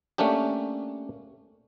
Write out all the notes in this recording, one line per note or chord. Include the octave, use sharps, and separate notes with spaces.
A3 A#3 C#4 D4 G4